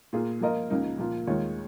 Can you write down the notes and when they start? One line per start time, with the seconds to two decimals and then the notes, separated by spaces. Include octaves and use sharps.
0.13 A#2 A#3 F4 G#4
0.41 F3 A#3 F4 A#4 D#5
0.70 C#2 C#3 F3 A#3 D#4
0.98 A#2 F3 A#3 F4
1.27 D#2 D#3 G#3 F4 C#5